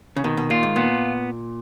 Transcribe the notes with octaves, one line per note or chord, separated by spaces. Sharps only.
C#3
B2 D#3
B2
A#2 F4
G#2
A#2 B3